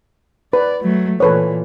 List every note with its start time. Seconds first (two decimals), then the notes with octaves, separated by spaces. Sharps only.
0.53 B4 D5
0.83 F#3 A3
1.20 A#2 E3 A4 B4 C#5